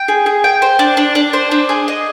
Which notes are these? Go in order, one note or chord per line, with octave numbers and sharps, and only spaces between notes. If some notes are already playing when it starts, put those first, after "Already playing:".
Already playing: G5
G#4
G#4
G5
C5
D4
D4
D4
C5
D4
G#4
D#5